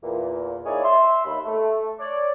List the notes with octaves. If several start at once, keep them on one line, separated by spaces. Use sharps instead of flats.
E2 A#2
A#3 D#4 E4 G#4 C#5 D5
E5 C6
D#2 B5
A3
C#5 D5